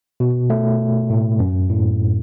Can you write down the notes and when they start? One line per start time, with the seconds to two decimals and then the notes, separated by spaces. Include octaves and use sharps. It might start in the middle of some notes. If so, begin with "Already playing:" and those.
0.20 B2
0.50 A3
1.10 A2
1.39 F#2
1.70 A2